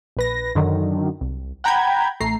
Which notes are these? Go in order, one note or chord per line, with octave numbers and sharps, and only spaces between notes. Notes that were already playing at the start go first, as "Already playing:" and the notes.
A#1 B4 A#6
F#2 D3 D#3 F#3
C2
F#5 G5 A#5 B5 G6 G#6
A1 A3 A#5 C7